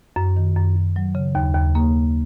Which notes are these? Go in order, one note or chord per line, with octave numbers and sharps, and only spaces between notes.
F#2
D#3
F#2
F#2
F#3
C#3
D#2
D#2
A#3